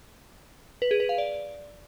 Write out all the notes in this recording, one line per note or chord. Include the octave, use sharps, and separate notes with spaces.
B4
G#4
B4
F5
D5